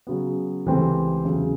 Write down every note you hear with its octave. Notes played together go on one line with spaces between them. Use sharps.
C#3 F#3 B3
C#2 C3 E3 A3 C4
E2 C#3 F#3